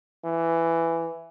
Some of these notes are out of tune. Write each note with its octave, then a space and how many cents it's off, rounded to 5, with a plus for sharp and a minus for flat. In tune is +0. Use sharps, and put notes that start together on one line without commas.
E3 +10